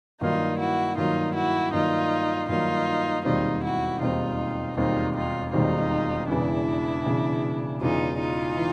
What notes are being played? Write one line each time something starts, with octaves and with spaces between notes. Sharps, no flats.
G2 D#3 F#3 A#3 D#4 F4
E4 F#4
G2 D#3 F#3 A#3 D#4 F4
E4 F#4
G2 D#3 F#3 A#3 D#4 F4
G2 D#3 F#3 A#3 D#4 F4
E1 D#2 D#3 G3 C4 D#4 F4
E4 F#4
E1 D#2 D#3 G3 C4 D#4 F4
E1 D#2 D#3 G3 C4 D#4 F4
D#4 F4
E1 D#2 D#3 G3 C4 D#4 F4
E1 E2 C#3 E3 D4 E4
E1 E2 C#3 E3
E1 E2 C#3 E3 D#4 F4
D#4 F4
E3